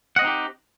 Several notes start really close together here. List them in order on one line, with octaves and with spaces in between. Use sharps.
F#5 D#5 C4 D#4 G4